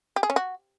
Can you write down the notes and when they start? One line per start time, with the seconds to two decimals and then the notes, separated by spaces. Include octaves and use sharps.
0.16 G4
0.23 G#4
0.30 C#4
0.36 F#4